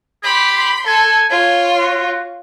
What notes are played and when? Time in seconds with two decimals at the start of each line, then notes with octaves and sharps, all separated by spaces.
0.24 G4 B5 C6
0.87 A4 G#5
1.30 F4 C#5 G#5
1.79 F#4